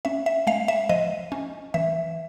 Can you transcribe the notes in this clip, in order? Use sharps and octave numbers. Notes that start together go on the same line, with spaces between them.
C#4 E5
E5
G#3 F5
E5
F3 D#5
C#4
E3 E5